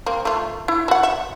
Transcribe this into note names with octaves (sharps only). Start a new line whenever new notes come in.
A#3 C4
A3 F4
E4
F#4 F#5
E5